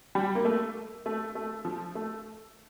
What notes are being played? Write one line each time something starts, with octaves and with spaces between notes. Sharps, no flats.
G3
A#3
A3
A3
A3
F3
A3